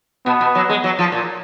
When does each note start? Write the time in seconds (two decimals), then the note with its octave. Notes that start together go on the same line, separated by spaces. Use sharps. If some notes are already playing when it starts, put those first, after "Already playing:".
0.26 B2 B3
0.41 B2
0.55 F#3
0.69 G#3
0.84 F#3
0.99 F3
1.12 A#2